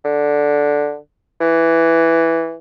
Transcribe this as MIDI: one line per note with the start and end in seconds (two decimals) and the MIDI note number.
0.05 0.96 50
1.41 2.57 52